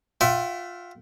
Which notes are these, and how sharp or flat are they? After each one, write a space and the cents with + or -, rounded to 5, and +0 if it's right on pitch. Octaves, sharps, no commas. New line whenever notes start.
F4 +15 E5 +10 G5 -40